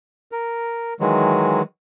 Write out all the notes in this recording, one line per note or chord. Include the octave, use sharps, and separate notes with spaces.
A#4
D#3 E3 F#3 G#3